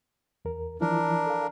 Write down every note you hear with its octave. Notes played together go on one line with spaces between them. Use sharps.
E2 A#4
E3 F3 D4 E4 A#4
A4 F5